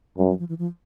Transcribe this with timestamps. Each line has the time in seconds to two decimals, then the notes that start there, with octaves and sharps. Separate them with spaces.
0.18 F#2 G3
0.29 F#3
0.39 F3
0.49 E3
0.59 F3